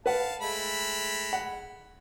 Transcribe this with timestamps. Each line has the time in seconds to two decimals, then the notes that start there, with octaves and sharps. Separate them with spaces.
0.06 B4 F5 F#5 A5
0.41 G#3 A3 B5
1.33 F#5